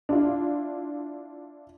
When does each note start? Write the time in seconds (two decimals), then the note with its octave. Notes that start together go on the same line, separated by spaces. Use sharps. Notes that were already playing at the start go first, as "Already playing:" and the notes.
0.09 D4 E4 F4